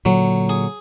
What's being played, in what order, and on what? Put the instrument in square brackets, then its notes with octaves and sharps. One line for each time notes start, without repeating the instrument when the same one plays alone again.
[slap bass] A#2 D3 [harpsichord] F#3
[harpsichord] G#4